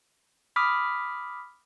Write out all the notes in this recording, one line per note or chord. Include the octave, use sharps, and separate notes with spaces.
B5 D6 D#6 F6 B6